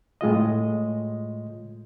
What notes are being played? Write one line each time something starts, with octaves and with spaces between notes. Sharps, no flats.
A2 G#3 F4 D#5